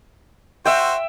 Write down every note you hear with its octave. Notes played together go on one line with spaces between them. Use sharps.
F#4 C5 E5 G5